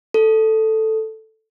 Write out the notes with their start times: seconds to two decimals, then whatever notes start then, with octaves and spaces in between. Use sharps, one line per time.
0.14 A4